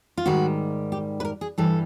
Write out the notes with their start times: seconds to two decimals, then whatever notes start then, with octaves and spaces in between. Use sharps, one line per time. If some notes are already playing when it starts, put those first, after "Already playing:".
0.17 F4
0.26 G#2 D#3 G3 F#4
0.92 G4
1.20 B4
1.25 A#4
1.41 G#4
1.58 G2 E3 G3 A4